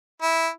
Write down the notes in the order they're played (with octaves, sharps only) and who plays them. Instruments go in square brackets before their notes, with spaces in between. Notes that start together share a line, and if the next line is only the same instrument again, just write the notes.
[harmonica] E4